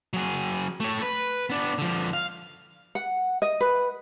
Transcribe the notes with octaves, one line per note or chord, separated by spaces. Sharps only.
F#3 G#4
A3 C#5
B4
B3 D4
D3 F3
F5
F#5
D#5
B4